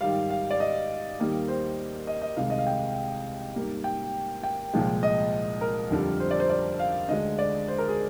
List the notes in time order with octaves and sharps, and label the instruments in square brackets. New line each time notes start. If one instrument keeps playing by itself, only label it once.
[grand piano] G#2 D#3 G3 F5
F5
D5
D#5
D#2 D#3 G3 A#3
C5
D#5
D#5
C2 C3 D#3 G#3 F5
D#5
F5
G5
G#2 G3 A#3
G5
G5
C2 A#2 F3 G#3
D#5
A#4
F2 D3 G3
C5
D5
C5
D5
F5
D2 D3 G#3 D#5
D5
C5
A#4
G#4